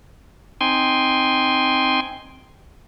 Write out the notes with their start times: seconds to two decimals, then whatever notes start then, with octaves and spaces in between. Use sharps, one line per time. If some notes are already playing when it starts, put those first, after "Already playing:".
0.61 C4 D#4 G5 G#5 C6